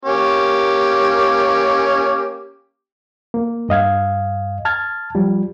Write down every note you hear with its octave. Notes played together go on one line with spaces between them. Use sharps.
A#3 C#4 G4
A#3
G2 D#5 F5 G#6
A5 F6 G#6 A6
F3 G3